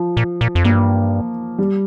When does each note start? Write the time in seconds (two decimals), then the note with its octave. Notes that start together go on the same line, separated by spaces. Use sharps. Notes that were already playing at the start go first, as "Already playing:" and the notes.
Already playing: F3
0.17 A#2
0.41 A#2
0.55 F2
0.64 G2 A#3
1.58 G3